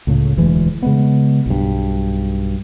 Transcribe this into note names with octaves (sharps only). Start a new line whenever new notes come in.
C#2 A2 C#3
E1 D2 E3 G#3
C#3 G#3 B3
B1 G2